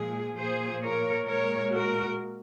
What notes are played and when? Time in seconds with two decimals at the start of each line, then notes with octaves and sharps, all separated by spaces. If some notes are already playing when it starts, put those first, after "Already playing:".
Already playing: A#2 F3 G#3 G#4
0.38 A#2 F3 A#3 G#4 C5
0.83 A#4 C#5
1.28 A#2 G#3 A#4 C#5
1.72 F#4 A#4